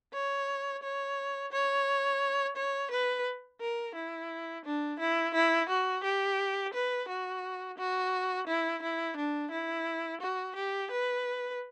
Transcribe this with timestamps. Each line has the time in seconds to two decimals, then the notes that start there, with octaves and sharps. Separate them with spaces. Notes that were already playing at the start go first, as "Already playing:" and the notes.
0.13 C#5
0.83 C#5
1.52 C#5
2.56 C#5
2.91 B4
3.60 A#4
3.95 E4
4.65 D4
4.99 E4
5.34 E4
5.69 F#4
6.04 G4
6.73 B4
7.08 F#4
7.78 F#4
8.47 E4
8.82 E4
9.17 D4
9.51 E4
10.21 F#4
10.56 G4
10.91 B4